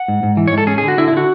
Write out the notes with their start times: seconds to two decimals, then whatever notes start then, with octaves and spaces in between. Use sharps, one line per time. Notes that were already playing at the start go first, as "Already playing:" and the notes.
Already playing: F#5
0.08 G#2
0.23 G#2
0.37 E3
0.48 C#5
0.53 G#2 A4
0.67 C#4 G#4
0.78 G#4
0.83 D3 F#4
0.98 D3 E4
1.08 E4
1.12 D3 F#4